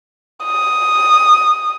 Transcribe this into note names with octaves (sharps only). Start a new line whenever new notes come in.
D#6